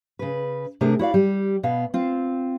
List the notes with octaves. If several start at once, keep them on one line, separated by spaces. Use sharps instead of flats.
C#3 B4
C3 A3 D4 G#4 A#4
E4 F#4 D5 F5
G3 G4
B2 B3 F5
C4 F4